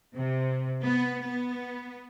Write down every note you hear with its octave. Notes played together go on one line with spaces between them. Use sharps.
C3
B3
B3